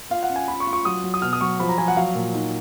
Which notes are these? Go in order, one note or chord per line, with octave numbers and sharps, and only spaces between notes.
F4 F5
F#5
C#4
G#5
F4 B5
C#6
F4
C#6
F#3 D#6
F#3
D#6
B2 F6
D#6
F#3 C#6
F3 B5
A#5
F3 G#5
F#5
F#3 F5
A#2
D#4